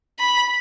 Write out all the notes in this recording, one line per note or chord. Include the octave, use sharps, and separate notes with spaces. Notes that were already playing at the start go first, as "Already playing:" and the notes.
B5